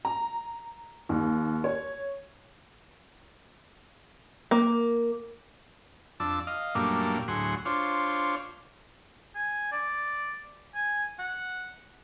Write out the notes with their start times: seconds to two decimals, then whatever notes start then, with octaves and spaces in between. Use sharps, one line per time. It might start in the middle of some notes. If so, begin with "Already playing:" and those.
0.05 A#5
1.09 D#2
1.64 C#5
4.51 A#3
6.20 F2 D4 A5 E6
6.47 D#5 F5
6.75 F#2 A#2 G3 A3 A#3 D4
7.28 D2 A2 F#3 G#4 F#5 C6
7.65 D4 F4 C5 C#5
9.35 G#5
9.72 D5
10.75 G#5
11.19 F#5